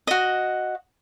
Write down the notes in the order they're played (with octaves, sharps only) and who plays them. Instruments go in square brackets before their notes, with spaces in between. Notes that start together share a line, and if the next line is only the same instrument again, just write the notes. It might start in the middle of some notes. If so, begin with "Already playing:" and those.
[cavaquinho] F#4 D#5